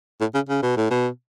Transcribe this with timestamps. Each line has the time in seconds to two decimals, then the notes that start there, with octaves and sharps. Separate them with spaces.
0.21 A2
0.34 C#3
0.49 C#3
0.63 B2
0.77 A2
0.90 B2